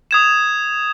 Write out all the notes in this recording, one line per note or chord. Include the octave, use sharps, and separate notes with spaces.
D#6 G#6 E7